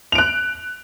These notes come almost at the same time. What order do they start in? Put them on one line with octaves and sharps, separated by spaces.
F7 D7 F#6